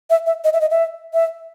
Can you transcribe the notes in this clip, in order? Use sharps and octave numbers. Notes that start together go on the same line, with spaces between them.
E5
E5
D#5
E5
D#5
E5
E5